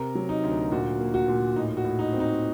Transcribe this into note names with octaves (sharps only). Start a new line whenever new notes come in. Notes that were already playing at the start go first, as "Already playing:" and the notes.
Already playing: C3 A#4
F#3
D#4
D2
A#2 F#4
A#3
F#4
A#2
A2 D#4
F#4
A2
D#4
C4
D#4